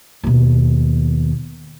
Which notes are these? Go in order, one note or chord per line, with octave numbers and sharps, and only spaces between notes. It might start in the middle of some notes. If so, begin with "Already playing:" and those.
D#2 B2